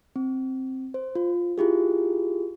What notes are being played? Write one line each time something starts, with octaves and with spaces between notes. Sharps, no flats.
C4
C5
F4
E4 F4 G4 G#4